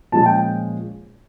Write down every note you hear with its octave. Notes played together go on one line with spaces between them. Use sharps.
A#2 F3 G#3 C#4 A5
G5